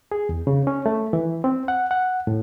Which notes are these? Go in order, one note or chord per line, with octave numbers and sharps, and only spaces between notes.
G#4
E2
C#3
C#4
A3
E3
C4
F#5
F#5
A2